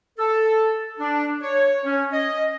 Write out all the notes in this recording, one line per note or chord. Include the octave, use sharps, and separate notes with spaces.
A4
D4
C#5
C#4
D#5